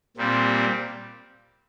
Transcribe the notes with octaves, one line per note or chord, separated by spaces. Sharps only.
A#2 G3 C4